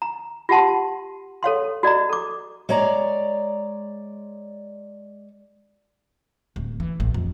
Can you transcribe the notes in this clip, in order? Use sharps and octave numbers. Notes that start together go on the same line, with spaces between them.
A#5
F4 G4 F#5 A5 C6
A4 C#5 F5 C6
F#4 D5 D#5 A#5
A4 D6
G#3 C#5 D5 A#5
D1
E3
A1
F2